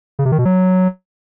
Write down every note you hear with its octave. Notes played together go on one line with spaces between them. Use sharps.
C#3
C3
D#3
B2
F#3